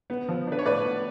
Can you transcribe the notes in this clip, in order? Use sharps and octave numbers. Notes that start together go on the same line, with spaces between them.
B3
F3
D4 B4
C#5
A2 B4 D5
B3